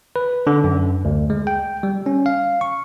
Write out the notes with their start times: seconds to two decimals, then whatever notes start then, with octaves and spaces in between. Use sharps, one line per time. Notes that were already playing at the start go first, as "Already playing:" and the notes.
0.16 B4
0.47 D3
0.64 F#2
1.05 D2
1.30 G#3
1.47 G5
1.83 G3
2.06 C#4
2.26 F5
2.61 C#6